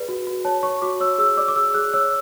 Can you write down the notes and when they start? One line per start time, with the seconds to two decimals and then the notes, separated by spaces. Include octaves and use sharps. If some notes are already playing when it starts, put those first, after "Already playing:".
Already playing: G#4 B4 D5
0.08 F#4
0.27 F#4
0.45 C#5 A5
0.63 C#5 C#6
0.82 F#4 D6
1.00 C#5 E6
1.18 G#4 E6
1.37 D5 D6
1.48 D6
1.56 G#4 E6
1.74 G#4 F#6
1.94 C#5 E6